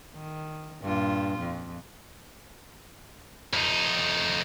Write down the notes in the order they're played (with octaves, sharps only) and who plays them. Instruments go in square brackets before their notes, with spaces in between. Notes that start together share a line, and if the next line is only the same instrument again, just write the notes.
[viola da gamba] D#3
G2 A#2 F4
F2
[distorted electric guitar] F2 D#4